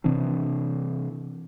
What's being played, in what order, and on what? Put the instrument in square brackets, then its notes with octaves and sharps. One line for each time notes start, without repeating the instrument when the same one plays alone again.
[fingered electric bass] C3 E3 C4 D4